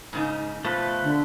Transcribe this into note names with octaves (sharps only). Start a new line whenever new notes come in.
G#2 C#3 D#4
B2 F3 A3 B4
D3